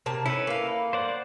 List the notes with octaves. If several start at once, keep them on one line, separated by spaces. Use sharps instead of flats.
C3 A#3 A5
C#4 E4 A4 B4
A#3 F5
C5 D5 F#5